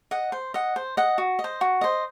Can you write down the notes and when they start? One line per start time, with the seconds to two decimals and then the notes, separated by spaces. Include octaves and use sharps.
0.11 D#5 F#5
0.32 C5
0.54 D#5 F#5
0.76 C5
0.97 D#5 F#5
1.18 F#4
1.39 D#5
1.44 C5
1.61 F#4
1.81 C5 D#5